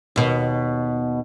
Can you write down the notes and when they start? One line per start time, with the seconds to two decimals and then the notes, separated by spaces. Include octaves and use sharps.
0.16 D#2 B2